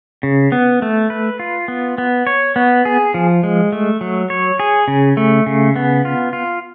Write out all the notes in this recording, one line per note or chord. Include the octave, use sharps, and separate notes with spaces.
C#3
B3
A3
B4
F4
B3
B3
C#5
B3
G#4
F3
G#3
A3
F#3
C#5
G#4
C#3
A3
C#3
B3
F4
F4